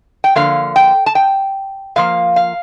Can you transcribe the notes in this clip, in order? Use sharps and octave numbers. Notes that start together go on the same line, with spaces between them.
G5
D3 F3 A#3 F5
G5
A5
G5
A2 F3 A#3 F5
F5